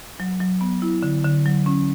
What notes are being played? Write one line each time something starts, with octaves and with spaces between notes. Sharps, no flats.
F#3
F#3
B3
E4
D3
D3
F#3
C#4